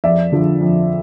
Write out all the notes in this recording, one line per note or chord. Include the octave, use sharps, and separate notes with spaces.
F2 D5 E5
D3 F3
F2